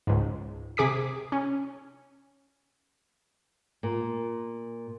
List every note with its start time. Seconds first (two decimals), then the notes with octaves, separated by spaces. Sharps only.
0.07 C#2 G#2
0.77 C3 G#4 D6 B6
1.32 C#4
3.83 A#2